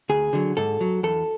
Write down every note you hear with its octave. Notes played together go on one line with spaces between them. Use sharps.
D2 G#4
D3 F#3
G#2 A4
F#3
E2 A4